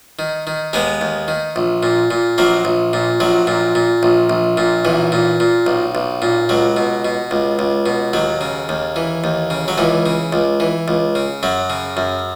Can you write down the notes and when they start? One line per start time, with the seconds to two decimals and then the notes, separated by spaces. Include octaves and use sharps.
0.19 D#3
0.47 D#3
0.73 D#2 G#3 B3
1.01 D#2
1.28 D#3
1.56 A#1
1.83 A#2
2.11 A#2
2.38 A#1 F#3 A#3
2.65 A#1
2.93 A#2
3.20 A#1 F#3
3.47 A#2
3.75 A#2
4.03 A#1
4.30 A#1
4.57 A#2
4.85 B1 E3
5.12 A#2
5.40 A#2
5.67 B1
5.95 B1
6.22 A#2
6.49 C#2 F#3
6.77 B2
7.05 B2
7.31 C#2
7.59 C#2
7.86 B2
8.13 D#2 F#3
8.41 C#3
8.69 D#2
8.96 E3
9.24 D#2
9.50 C#3
9.68 F#3
9.78 C#2 E3
10.06 C#3
10.33 C#2
10.60 E3
10.88 C#2
11.15 C#3
11.43 F#2 F#3
11.70 C#3
11.97 F#2